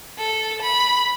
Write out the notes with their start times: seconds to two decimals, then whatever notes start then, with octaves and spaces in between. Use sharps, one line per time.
0.18 A4
0.62 B5